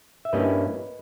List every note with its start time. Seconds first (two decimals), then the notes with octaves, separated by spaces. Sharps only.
0.25 E5
0.33 G2 G3 A#3 C#4 E4 B4 D#5